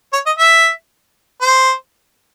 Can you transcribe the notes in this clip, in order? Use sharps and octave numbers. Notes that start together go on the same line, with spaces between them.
C#5
D#5
E5
C5